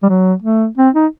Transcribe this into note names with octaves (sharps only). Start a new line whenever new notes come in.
G3
F#3
A3
C4
D#4